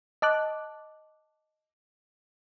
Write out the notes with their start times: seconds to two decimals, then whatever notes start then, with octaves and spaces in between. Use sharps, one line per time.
0.22 D#5 A5 D6 F#6